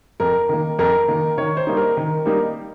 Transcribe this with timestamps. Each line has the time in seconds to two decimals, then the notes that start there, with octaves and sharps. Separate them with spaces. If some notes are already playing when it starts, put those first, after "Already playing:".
0.20 F2 A#4
0.49 D#3 A#3
0.79 F2 A#4
1.08 D#3 A#3
1.38 D#3 C#5
1.57 C5
1.67 G3 A#3 D#4
1.77 A#4
1.97 D#3
2.26 G3 A#3 D#4